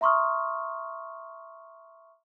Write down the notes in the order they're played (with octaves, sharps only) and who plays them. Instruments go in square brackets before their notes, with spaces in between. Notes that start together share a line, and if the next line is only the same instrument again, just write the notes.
[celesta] E5 A#5 C6 C#6 D#6 F6